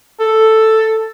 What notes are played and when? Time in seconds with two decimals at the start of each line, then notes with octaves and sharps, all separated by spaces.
0.20 A4